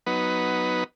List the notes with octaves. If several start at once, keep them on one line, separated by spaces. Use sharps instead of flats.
F#3 B3 D#4 B4